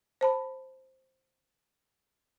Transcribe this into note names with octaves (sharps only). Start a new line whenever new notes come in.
C5 A5 B5